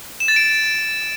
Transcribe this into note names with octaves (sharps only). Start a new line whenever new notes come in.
E7
A6
D7